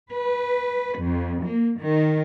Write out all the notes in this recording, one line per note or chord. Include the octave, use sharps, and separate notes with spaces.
B4
F2
A#3
D#3